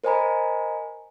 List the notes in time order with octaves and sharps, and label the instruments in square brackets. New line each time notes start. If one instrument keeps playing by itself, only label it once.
[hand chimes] A#4 C5 D#5 G#5 A#5 B5